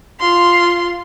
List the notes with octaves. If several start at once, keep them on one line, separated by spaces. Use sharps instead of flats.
F4 C6